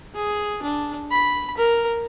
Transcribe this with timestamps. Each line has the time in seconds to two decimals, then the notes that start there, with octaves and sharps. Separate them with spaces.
0.15 G#4
0.63 D4
1.11 B5
1.58 A#4